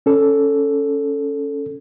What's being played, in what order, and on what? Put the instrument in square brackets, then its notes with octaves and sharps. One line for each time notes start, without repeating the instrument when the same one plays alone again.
[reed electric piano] C#4 A4